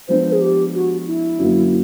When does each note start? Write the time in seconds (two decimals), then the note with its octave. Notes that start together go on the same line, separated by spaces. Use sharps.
0.09 F3 G#3 B3 D4 C5
0.32 G#4
0.41 G4
0.74 F#4
1.07 E4
1.39 F#2 D3 F#3 A#3